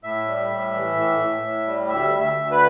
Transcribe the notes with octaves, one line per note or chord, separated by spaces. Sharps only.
A2 E5
G3
A2
E3
A2
A2
A2
G3
D2 E5
D2
E5
D2
B4